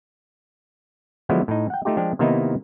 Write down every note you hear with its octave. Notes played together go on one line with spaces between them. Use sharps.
D3 F3 F#3 G#3 B3 E4
A2 D#4
F#5 G5
A3 D#4 F4 G4
F3 G#3 D4 G4
C3 D#3 A#3 B3 D#4 E4